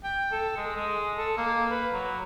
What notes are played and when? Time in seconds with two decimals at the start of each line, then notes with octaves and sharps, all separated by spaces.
0.04 G5
0.32 A4
0.56 G#3
0.76 G#3
1.18 A4
1.37 A#3
1.71 B4
1.93 F#3